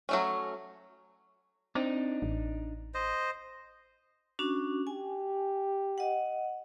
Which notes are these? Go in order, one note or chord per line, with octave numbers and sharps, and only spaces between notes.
F#3 A3 C#4
C4 D4 D#4
A1
C5 D#5
C#4 D4 F#4
G4 G#5
D#5 F#5